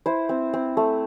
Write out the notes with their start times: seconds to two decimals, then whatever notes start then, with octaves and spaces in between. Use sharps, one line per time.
0.06 E4 C5
0.29 C4
0.54 C4
0.77 A3